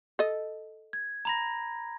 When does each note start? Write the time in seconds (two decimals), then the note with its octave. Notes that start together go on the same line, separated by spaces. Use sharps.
0.19 A4 D#5
0.93 G#6
1.25 A#5 B5 A#6